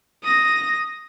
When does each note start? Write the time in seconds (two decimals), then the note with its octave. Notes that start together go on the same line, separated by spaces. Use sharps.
0.23 D#6 A#6